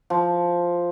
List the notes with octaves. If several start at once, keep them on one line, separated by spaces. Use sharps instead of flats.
F3